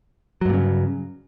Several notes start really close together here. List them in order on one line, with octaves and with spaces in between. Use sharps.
F#3 G2 A#2 C#3